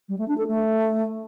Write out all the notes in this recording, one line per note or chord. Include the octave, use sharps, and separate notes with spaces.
G3
A3
D4
A4
A3